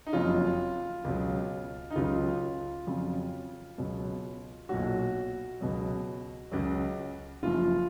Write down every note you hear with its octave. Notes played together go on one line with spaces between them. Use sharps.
D#4
F#1 F2 C#3 F#3 F4
C#2 B2 F#3
D#4
C#2 C#3 F#3 F4
F2 C#3 F#3
C#2 B2 F#3
B1 A#2 F#3 F#4
C#2 B2 F#3
C#2 C#3 F#3
F#1 F#2 F3 F4